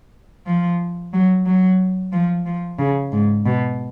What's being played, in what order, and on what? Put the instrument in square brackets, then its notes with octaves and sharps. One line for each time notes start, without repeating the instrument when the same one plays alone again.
[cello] F3
F#3
F#3
F3
F3
C#3
G#2
B2